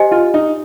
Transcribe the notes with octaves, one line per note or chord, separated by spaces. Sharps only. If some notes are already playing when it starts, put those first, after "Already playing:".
Already playing: G4 C5 D#5 G#5
F4
D#4